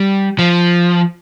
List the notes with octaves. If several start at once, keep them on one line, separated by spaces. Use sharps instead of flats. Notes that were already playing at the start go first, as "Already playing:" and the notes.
Already playing: G3
F3